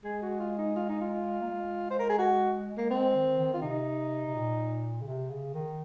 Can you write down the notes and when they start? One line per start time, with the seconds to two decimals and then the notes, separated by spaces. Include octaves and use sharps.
0.04 G#3 G#4
0.22 F#4
0.40 F4
0.58 D#4
0.76 F4
0.89 D#4
1.01 F4
1.41 A#3
1.48 G#3
1.91 C5
2.00 A#4
2.10 G#4
2.19 F#4
2.78 A#3
2.90 G#3 C4
3.15 D#3
3.39 D#3
3.53 F4
3.62 C3 D#4
4.26 C3
4.35 A#2
5.01 C#3
5.07 C3
5.30 C#3
5.54 D#3